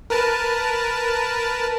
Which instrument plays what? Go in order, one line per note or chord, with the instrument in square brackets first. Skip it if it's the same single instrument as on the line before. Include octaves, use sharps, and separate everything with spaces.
[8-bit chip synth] A#4 B4 A5